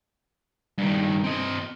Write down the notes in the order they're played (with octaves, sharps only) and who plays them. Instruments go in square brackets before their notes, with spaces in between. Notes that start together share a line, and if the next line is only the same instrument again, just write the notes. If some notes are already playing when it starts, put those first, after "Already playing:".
[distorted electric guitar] G2 D#3
C4 D#5